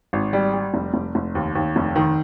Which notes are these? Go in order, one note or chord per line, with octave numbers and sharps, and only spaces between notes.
G#1
G3
G3
F1
F1
F1
D#2
D#2
F1
D#3